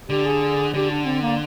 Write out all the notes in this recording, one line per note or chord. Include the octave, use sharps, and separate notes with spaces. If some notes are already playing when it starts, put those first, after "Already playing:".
D3 G4
G#4
D3 G4
D4
C4
A#3